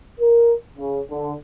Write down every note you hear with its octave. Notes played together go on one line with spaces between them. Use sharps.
A#4
C#3
D3